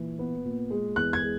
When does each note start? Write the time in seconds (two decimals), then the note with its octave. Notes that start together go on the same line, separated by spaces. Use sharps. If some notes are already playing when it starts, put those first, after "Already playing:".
Already playing: A#2 E3
0.19 B3
0.45 A#2
0.70 G#3
0.96 E2 F#6
1.13 G#6
1.22 G#3